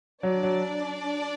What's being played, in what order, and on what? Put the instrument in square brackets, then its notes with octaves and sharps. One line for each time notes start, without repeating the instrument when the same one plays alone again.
[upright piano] F#3 [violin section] D4 D5
[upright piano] F#3